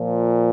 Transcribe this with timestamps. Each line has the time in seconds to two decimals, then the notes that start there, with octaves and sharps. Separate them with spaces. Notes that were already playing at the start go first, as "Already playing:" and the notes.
Already playing: A#2 F3